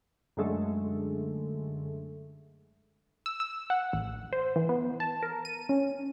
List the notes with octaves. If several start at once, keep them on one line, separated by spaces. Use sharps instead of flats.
F#2 D3 G#3 A3
E6
E6
F#5
A1
C5
E3
B3
A5
A#4
D#7
C#4